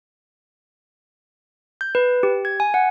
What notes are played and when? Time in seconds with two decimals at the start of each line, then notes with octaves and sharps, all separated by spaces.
1.81 G6
1.95 B4
2.23 G4
2.45 G#6
2.60 G#5
2.74 F#5